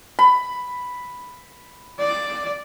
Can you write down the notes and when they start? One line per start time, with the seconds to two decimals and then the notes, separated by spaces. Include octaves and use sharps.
0.19 B5
1.99 D5